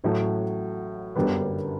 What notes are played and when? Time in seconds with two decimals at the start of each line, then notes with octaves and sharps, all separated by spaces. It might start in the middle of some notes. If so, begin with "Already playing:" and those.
0.04 A1 A2 F#3 A3
1.16 G1 F#2 D3 G3 B3